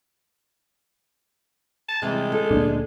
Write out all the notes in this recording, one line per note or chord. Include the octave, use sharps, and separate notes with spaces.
A5
C3 E3 G3 G#3
A4
D1 A#2 D4